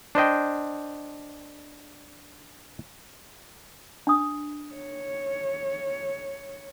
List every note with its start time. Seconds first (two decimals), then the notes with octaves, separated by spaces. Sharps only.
0.15 D4 C5 D#5 G5
4.07 D4 D#6
4.75 C#5